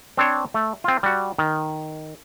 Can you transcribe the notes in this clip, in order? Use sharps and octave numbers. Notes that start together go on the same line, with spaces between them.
C4 D4 C5 C#5
A3
C4 F4
G3 F#4
D#3